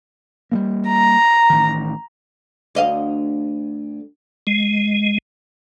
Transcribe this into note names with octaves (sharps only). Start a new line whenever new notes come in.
G3 A3 A#3
A#5
A1 D#3
D2 D#5 F5
G#3